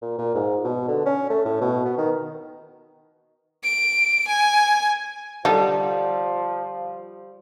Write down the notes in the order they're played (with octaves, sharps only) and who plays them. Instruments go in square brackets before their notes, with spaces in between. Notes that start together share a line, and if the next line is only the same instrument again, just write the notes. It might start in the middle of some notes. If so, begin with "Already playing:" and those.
[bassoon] A#2
A#2
G#2
B2
D3
C#4
A3
A2
B2
B3
D#3
[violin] D7
G#5
[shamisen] D3 D#4 A4 [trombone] F3 [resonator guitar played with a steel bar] G3